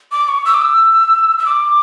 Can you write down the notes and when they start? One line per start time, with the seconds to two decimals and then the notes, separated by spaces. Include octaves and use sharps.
0.12 D6
0.28 C#6
0.45 E6
0.54 D6
0.62 E6
1.38 E6
1.46 D6